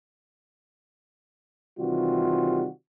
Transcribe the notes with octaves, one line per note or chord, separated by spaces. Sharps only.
C3 D#3 E3 G3 F4 F#4